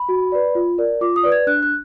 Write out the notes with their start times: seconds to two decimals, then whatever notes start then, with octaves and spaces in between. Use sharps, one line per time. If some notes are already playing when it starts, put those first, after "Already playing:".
Already playing: B5
0.09 F#4
0.32 B4 D5
0.55 F4
0.78 A#4 D5
1.01 F4 D6
1.16 D#6
1.23 B4 D5
1.32 G#6
1.47 D4 F#6
1.63 F#6